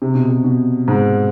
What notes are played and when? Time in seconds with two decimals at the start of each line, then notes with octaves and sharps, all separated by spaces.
0.02 C3
0.15 B2
0.29 C3
0.44 B2
0.88 G#2